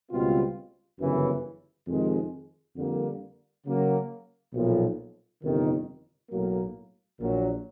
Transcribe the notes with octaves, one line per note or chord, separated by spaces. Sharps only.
C#2 B2 G3 C4 F4
G1 F#2 C#3 E3
F2 C3 D#3 G#3
F2 D3 G3 A#3
C#3 F#3 A#3
B1 A#2 F3
G1 F2 C3 D#3
B1 A2 F#3 A#3
A#1 A#2 F#3